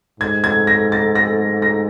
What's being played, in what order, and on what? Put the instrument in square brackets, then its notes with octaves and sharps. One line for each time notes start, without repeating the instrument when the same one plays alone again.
[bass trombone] G#2 [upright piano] G#6
[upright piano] G#6
A#6
A6
A#6
A#6